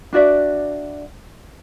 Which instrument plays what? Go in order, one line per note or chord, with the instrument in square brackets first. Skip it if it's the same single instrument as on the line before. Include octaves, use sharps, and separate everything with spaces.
[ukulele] D4 F#4 D5 E5